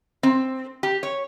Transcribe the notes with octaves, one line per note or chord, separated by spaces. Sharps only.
C4
G4
C#5